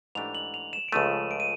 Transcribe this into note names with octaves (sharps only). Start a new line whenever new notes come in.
G#2 E3 A3 D4 G4 F7
F#7
F7
E7
D7
C#2 C#3 F3 A3 D#7
D7
D#7